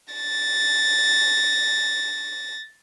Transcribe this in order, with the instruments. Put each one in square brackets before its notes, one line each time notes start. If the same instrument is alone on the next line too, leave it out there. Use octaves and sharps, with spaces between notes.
[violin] A6 A#6